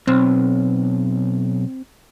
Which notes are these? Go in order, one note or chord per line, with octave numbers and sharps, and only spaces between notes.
B1 C4